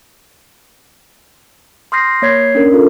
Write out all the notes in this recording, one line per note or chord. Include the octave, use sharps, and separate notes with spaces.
C6 D#6 F6 G6 A#6 C7
A#3 C#5 G#6 B6 C7
C#4 D4 A#4
F4 A4 A#4